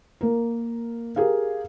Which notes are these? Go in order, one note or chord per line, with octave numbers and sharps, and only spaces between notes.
A#3 A#4
G4 G#4 A#4 F5